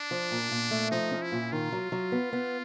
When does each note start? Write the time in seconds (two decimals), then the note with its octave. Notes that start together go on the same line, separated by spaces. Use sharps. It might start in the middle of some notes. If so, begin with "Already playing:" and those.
Already playing: D4
0.11 F3
0.31 A#2
0.51 A#2
0.71 A3
0.91 F3 D#4
1.11 C#4
1.22 E4
1.32 A#2
1.52 D#3 F4
1.72 F#3
1.92 F#3
2.12 B3
2.33 B3